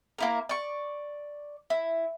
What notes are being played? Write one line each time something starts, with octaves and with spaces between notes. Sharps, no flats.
A#3 E4 A#4
D5 C#6
E4